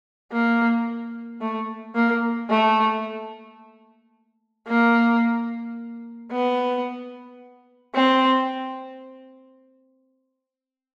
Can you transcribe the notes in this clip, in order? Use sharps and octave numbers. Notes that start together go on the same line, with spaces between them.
A#3
A3
A#3
A3
A#3
B3
C4